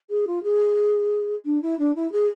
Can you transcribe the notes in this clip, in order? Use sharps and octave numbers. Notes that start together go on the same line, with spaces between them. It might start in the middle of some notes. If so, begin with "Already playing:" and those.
G#4
F4
G#4
D4
E4
D4
E4
G#4